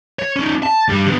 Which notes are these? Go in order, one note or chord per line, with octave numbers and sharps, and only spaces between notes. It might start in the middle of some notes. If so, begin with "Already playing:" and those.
C#5
C#4 D#4
A5
G2 G3
D3 B3